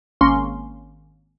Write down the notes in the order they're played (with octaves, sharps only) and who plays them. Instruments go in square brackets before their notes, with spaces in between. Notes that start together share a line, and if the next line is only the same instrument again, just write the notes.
[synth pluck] G#1 A#3 C#4 C6